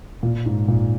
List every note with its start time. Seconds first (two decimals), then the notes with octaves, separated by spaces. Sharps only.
0.23 A#2
0.46 G#2
0.68 A#2